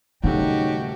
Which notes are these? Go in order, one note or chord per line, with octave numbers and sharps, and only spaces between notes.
D#1 C#3 F#3 A3 C4 D#4 F#4 G4